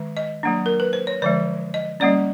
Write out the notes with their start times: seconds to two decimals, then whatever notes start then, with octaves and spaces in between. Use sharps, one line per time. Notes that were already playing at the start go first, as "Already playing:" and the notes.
Already playing: D#3 G#3
0.17 D#5
0.43 F#3 A#3 D4
0.66 A#4
0.80 B4
0.93 C5
1.07 C#5
1.22 D3 F3 G#3 D5
1.74 D#5
2.00 G3 A#3 C#4 D5